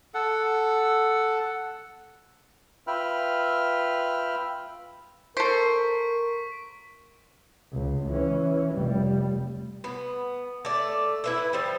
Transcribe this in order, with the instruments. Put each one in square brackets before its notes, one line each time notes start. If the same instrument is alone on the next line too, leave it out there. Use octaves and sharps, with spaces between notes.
[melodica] A4 F#5
[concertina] F4 B4 E5 G5 B5 F6
[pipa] A4 C5 [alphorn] A#4 [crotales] C#6 B6 D7
[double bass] C#2
E3 C#4
F1 G3
[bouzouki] B3
A3 D5
E4 B4 E5
F3 G3